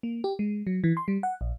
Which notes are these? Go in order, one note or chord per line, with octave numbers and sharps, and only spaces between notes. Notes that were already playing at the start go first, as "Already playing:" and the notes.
A#3
G4
G#3
F#3
E3
C6
G3
F#5
A#1